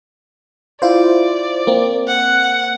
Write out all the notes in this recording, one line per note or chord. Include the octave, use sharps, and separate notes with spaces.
E4 F4 C5 D5
A#3 C4
F#5